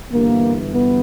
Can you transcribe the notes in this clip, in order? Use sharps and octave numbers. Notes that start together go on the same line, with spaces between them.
G1 G2 E3 A#3
B3